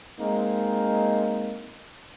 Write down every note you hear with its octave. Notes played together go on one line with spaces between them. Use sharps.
G#3 A#3 C4 D#4